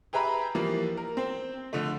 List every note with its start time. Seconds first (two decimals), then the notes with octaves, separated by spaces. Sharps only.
0.13 G4 G#4 B4 E5 A#5 B5
0.55 E3 F3 G3 A#3
0.97 A#4
1.17 C4 C5
1.73 D3 F3 A3